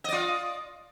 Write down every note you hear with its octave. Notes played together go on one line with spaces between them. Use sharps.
F4 D5 D#5